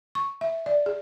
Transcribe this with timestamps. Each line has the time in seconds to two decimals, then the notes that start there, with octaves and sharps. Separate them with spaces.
0.15 C#6
0.41 E5
0.66 D5
0.86 G#4